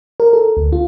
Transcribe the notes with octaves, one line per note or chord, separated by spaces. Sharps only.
A#4
A4
D2
F4